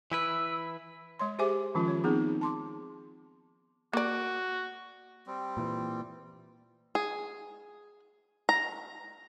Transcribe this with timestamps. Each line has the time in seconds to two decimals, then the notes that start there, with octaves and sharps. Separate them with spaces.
0.12 E3 E4 B4 E6
1.19 G#3 C#5 C6
1.39 G4 G#4 C5 E5 G#5 D6
1.75 D#3 F3 G#3 C#4 F4
1.88 C#5
2.04 B3 C4 D#4 G#4
2.41 A5 C6 D6
3.93 A#3 F#4 D5
5.27 G3 C4
5.57 A#2 E3
6.95 G#4
8.49 A#5